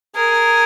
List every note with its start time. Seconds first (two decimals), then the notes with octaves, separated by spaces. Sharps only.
0.16 G#4 A#4